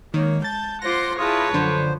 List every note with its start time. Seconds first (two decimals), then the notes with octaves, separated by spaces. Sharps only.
0.14 D#3 G#3 A#3 C#5
0.44 A5 G6 A6
0.82 F4 C5 F#5 C6 D6 A#6
1.18 E4 F4 G#4 B4 C#5 A5 D#6
1.54 F#2 D3 F3 C5